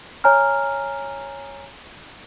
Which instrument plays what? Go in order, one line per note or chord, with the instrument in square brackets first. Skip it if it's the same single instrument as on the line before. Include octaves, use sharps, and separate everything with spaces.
[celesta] C#5 G#5 A#5 F6